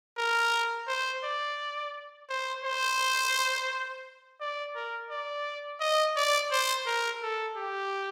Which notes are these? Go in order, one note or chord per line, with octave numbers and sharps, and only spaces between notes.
A#4
C5
D5
C5
C5
D5
A#4
D5
D#5
D5
C5
A#4
A4
G4